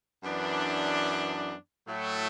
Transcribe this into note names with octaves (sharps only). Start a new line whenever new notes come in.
F#2 E3 B3 D4
A2 F#3 A3